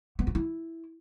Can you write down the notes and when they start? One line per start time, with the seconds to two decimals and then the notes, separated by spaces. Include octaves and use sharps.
0.19 B3
0.27 F4
0.35 E4